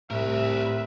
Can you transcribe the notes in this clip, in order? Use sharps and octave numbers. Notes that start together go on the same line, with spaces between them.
C2 A2 A#4 B4 E5